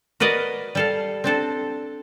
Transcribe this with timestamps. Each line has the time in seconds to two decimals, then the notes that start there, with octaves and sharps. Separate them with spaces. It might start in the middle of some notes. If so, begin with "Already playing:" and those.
0.20 F#4 A#4 B4 D5 D#5
0.75 G3 A4 F5
1.24 C4 D4 A4 C5